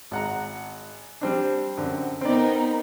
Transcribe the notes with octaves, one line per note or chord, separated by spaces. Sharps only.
G#1 F#5 A#5
G3 C4 D4
F#2 D3 C4
B3 C4 D#4 A#4 D5